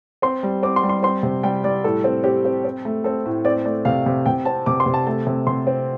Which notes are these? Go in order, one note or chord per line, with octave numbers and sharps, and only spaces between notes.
C4 C6
G3
C4 D6
C6
G3
C6
C4 C6
C3
G3 G5
G3 D5
A2 A4
C4
C4 G4
C4
C4
A3
C4 A4
A2
C4 D5
A3 D5
C3 F5
C3
C3 G5
C4 A5
C3 D6
C6
C3
A5
A3 A5
C3
C3 C6
C4